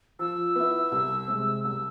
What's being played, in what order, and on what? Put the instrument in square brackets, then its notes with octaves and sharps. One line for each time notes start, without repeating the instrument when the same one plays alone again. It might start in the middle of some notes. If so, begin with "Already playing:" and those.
[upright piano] F3 [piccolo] E6
[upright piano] B3 E4
C2
C3 G#3 C4
[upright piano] C2 [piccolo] E6